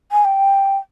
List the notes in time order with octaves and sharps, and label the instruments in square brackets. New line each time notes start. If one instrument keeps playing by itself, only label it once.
[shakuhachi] G#5
G5